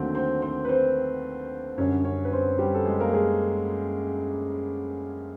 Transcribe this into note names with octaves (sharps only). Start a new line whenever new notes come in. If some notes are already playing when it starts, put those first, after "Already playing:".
Already playing: D#2 D3 F#3 A3 C4 C5
C4 C5
C4 C5
B4
C4 C5
F#2 D3 G3 C#4 C#5
C#4 C#5
B4
C4 C5
G3 G4
A4
G#3 G#4
A#3 A#4
G#3 G#4